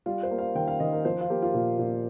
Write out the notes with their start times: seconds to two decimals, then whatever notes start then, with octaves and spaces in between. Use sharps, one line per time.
0.06 G3 F4
0.23 C5
0.31 A#3
0.38 F5
0.55 D#3 G5
0.68 F5
0.80 D#3 D#5
0.92 A#4
1.05 F3 C5
1.21 F4
1.30 A#3 G4
1.42 F4
1.54 A#2
1.79 A#2